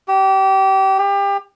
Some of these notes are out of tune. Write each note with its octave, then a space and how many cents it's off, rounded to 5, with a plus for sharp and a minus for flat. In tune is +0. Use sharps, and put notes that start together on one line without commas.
G4 -25
G4 +30